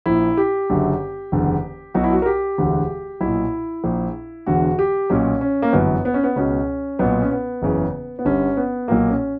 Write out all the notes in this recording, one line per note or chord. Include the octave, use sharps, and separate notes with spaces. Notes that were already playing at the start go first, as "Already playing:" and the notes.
A#1 A#2 E4
G4
F#1 F#2 D3
F#1 E2 D3
B1 B2 F#4
E4
F#4
A#4
G4
E1 D2 D3
B1 E4
A#2
A#1 A#2
E1 E2 D3 F#4
G4
B1 A#2 C#4
C#4
A#3
G1 F#2 E3 B3
B3
C#4
B3
C#2 B2 C#4
B1 A#2 B3
C#4
B3
F#1 E2 C#3 E3
B3
G1 G2 D3 C#4
B3
B1 A#2 A#3
C#4